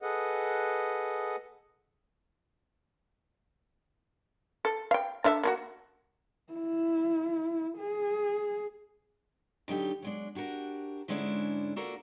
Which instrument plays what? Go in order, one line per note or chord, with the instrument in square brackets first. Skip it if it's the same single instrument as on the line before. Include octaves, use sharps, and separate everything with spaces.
[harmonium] G#4 A4 B4 D#5 F#5
[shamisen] A4
F5 G5
D4 A4 E5
A#3 F4 F#4
[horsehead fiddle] E4
G#4
[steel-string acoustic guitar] D3 F#3 D#4 G4
F#3 G#3 D4
D4 F#4 G4 A#4
G#2 D3 G#3 C#4 D4 E4
A#3 D4 F4 F#4 A4 A#4